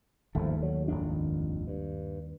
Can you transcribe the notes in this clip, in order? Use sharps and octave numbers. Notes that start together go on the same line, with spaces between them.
G1 D#2 G#2 F3 A3
F#3
G#1 F2 D4
G2